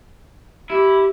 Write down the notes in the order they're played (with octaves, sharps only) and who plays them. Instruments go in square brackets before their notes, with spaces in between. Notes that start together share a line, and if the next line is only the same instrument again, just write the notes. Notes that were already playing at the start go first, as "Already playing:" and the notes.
[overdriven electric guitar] E4 [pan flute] G4